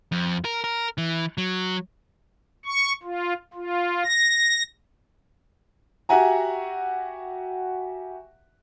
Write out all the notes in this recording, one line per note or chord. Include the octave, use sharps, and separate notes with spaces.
F2
A#4
A#4
E3
F#3
C#6
F4
F4
A#6
F#4 G4 E5 F#5 G#5 A#5